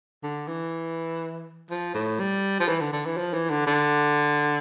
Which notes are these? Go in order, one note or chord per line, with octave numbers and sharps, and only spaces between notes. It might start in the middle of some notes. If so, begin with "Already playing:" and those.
D3
E3
F3
A2
G3
F3
E3
D3
D3
E3
F3
E3
D3
D3